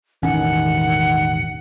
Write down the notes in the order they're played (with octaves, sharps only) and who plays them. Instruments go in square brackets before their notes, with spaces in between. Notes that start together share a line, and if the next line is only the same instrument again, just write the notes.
[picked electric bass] E1 A1 C#4 [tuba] D#3 [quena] F#5